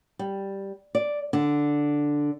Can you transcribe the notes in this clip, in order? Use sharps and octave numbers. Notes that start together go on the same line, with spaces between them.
G3
D5
D3